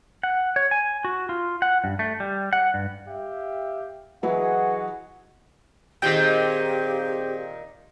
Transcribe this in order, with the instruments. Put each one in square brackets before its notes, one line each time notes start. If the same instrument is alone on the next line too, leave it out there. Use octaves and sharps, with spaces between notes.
[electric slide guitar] F#5
C#5
G#5
F#4
F4
F#5
G2
A3
G3
F#5
G2
[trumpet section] G4 E5 F5
[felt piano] E3 F#3 E4 [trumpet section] F#4 G#4 D#5 [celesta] B4 [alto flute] F#5
[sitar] A#2 D#3 [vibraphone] C4 G#4 C5 [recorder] G4 [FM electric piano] G5 G6